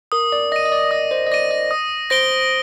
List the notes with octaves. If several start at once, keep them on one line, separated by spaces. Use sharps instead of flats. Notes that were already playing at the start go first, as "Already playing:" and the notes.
A#4 D#6
D5
D#5 A#6 D#7
D#5
D5
D#5 D#6
C5
D#5
D5 A#6 D#7
D#5
D#6
C5 A#6 D7 G7